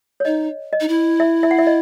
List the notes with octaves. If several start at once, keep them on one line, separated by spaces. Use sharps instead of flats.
C#5
D#4 D#5
D#5
D#4
E4
E5
E5
F#5
E5
D#5